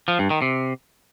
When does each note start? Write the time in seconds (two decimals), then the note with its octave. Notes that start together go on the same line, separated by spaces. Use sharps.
0.08 F3
0.19 G2
0.30 D#3
0.42 C3